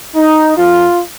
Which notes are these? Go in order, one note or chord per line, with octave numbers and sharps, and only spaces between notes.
D#4
F2 F3 F4